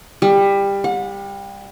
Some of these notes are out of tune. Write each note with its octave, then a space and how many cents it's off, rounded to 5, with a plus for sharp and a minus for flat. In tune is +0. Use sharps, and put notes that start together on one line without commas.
G3 +20
F#5 -35